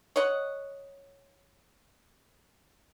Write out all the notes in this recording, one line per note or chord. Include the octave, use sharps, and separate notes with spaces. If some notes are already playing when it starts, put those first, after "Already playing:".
C#5 D#5 F#5